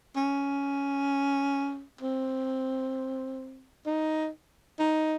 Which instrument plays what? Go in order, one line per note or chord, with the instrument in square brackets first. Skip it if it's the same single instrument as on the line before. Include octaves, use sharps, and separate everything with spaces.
[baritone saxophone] C#4
C4
D#4
D#4